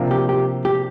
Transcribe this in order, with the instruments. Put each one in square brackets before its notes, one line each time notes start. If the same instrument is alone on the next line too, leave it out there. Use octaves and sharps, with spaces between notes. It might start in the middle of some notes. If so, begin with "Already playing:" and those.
Already playing: [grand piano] C3 F3 A#3 D4 F4
[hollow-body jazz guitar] G4
G4
G4